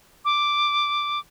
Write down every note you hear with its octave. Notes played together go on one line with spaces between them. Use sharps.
D6